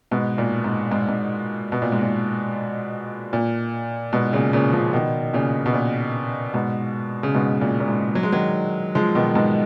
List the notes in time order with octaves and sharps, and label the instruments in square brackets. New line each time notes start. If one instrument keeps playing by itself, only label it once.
[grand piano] G#2 B2
A#2
G#2
G#2
G#2
B2
A#2
G#2
A#2
A#2
G#2 B2
A#2 C#3
A#2 C#3
C#3 F3
B2 D#3
A#2 C#3
B2
A#2
G#2 B2
C#3
G#2 B2
A#2
A#2
G#2
F#3
G#3
D#3 F#3
F3 G#3
B2 D#3
G#2 B2